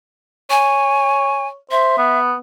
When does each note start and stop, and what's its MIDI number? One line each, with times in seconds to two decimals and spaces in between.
0.50 1.57 73
0.50 1.47 80
1.71 1.93 72
1.71 2.19 76
1.98 2.35 59